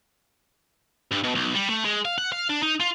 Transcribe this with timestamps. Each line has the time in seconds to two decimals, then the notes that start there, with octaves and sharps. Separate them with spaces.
1.11 G2
1.24 B2
1.35 B1
1.55 G3
1.69 A3
1.85 G#3
2.05 F5
2.18 F#5
2.32 F5
2.49 D4
2.63 D#4
2.80 F4